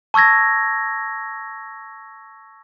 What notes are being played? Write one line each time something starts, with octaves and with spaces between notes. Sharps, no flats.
A5 C#6 E6 G#6 A#6